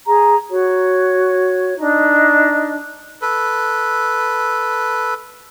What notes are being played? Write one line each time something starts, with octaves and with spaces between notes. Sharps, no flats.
G#4 A#5
F#4 C#5
D4 D#4 D#5
A4 B4